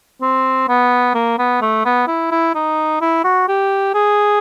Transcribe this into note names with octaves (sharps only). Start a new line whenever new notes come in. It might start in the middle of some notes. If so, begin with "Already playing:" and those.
C4
B3
A#3
B3
A3
B3
E4
E4
D#4
E4
F#4
G4
G#4